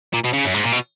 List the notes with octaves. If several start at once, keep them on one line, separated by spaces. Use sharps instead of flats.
A#2
B2
C#3
F#2
G#2
A#2
B2